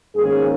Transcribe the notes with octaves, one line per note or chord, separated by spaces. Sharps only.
G#2 D#3 A#3 C#4 G#4